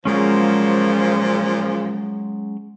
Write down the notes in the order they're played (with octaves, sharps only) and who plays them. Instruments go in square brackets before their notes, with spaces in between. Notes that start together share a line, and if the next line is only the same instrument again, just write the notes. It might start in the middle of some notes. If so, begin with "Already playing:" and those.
[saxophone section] A#2 C#3 F3 [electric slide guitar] F#3 G#3 C#4